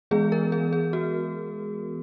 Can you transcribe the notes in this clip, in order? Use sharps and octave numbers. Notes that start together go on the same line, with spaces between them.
E3 G#3 B3 G#4
A#4
G#4
G#4
F#4